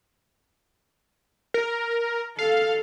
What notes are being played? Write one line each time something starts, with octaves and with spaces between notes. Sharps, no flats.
A#4
A4 F5